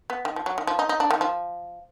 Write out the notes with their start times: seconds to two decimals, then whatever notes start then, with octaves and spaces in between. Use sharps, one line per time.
0.10 B3
0.25 D#3
0.36 F3
0.46 F#3
0.58 D#3
0.67 F3
0.79 D#4
0.89 D#4
1.00 D4
1.10 D#3
1.21 F3